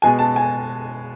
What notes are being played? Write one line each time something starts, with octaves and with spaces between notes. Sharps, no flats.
B2 G#3 B3 G#5
A5
G#5